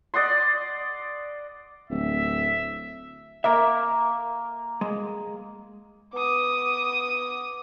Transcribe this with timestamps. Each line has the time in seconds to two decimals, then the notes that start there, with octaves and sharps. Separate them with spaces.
0.14 D5 D#5 F#5 C6
1.90 D1 E5
3.44 A#3 A#4 E5
4.81 G#3
6.14 B3 D6 D#6